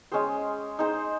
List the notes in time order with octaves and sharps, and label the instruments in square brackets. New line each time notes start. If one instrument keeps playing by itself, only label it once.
[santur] G#3 C#4 G#4 C5
D#4 G#4 C5 D#5